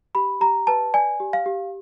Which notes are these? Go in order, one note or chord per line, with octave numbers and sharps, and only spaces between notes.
G4 B5
G4 A#5
B4 A5
D5 G#5
G4
F5
G4